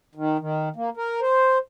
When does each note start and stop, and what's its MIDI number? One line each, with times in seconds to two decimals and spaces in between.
0.15 0.38 51
0.39 0.69 51
0.76 0.90 58
0.97 1.20 70
1.21 1.58 72